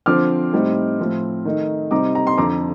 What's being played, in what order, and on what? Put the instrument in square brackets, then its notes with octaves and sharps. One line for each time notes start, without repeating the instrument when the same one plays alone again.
[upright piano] D3 F3 C4 D6 F6
A2 G3 C4 D#4
A2 F3 C4
D#3 A3 D#4
C3 G3 C4 D#4 A#5 D6
A#5
C6
F2 D3 F3 A#5 D6